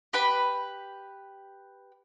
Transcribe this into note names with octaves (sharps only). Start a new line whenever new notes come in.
G4 B4 B5